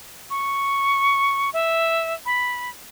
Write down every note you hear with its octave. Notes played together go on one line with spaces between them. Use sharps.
C#6
E5
B5